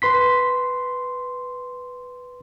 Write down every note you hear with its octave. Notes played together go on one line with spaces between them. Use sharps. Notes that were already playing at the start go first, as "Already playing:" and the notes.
B4 C6 B6